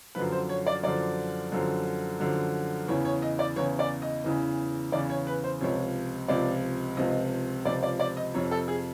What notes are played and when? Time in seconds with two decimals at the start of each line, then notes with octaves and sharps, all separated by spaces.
0.15 F#2 D3 F3 B4
0.32 C5
0.49 C#5
0.67 D5
0.83 F#2 D3 F3 D5
1.52 F#2 D3 F3
2.20 F#2 D3 F3
2.88 E2 C#3 E3 C#5
3.05 C#5
3.22 D#5
3.39 D5
3.56 E2 C#3 E3 C#5
3.79 D5
4.02 D#5
4.24 E2 C#3 E3
4.92 E2 C#3 E3 D5
5.10 C#5
5.27 B4
5.44 C5
5.61 C#2 C3 F3 C#5
6.28 C#2 C3 F3 D5
6.97 C#2 C3 F3 D#5
7.65 C#2 C3 F3 D5
7.83 D5
8.00 D5
8.17 D#5
8.34 F2 C3 F3 C#5
8.51 A4
8.68 G#4